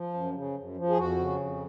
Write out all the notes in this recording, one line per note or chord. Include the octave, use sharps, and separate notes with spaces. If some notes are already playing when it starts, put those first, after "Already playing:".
Already playing: F3
F#2
C#3
F#2
F3
G#4
F2 F#4
C#3
F2